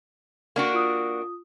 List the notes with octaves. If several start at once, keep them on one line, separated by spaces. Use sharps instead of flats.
A#3 D4 F#4
F4 D#6